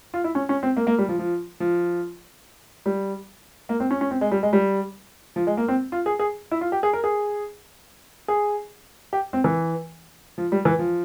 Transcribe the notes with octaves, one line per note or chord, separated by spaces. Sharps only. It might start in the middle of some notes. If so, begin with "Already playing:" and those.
F4
E4
C#4
C#4
C4
A#3
A#3
G3
F3
F3
F3
G3
A#3
C4
C#4
C#4
C4
G#3
G3
G#3
G3
F3
G#3
A#3
C4
F4
G#4
G#4
E4
F4
G4
G#4
A#4
G#4
G#4
G4
C4
E3
F3
G3
E3
F3